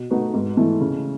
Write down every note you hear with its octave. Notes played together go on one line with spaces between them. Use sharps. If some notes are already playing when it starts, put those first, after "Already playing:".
Already playing: B2
A3 D#4 F#4 B4
G#2
E3 A3 E4
C#3